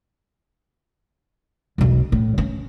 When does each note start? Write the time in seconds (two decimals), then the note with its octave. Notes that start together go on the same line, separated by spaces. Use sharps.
1.78 E1 B1
2.12 A2
2.38 C#4